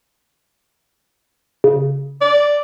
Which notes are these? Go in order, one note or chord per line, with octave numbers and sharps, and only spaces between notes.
C#3
D5